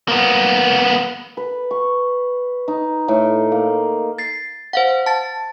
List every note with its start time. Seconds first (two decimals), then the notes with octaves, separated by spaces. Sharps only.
0.08 A#3 B3
1.37 B4
1.71 C#6
2.68 D#4
3.08 A2
3.52 A#3
4.18 A6 C7
4.73 C5 F5 F#5
5.06 A5 A6